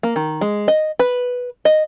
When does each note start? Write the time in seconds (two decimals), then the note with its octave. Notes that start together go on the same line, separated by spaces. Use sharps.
0.03 A#3
0.16 D#3
0.41 G#3
0.68 D#5
0.99 B4
1.65 D#5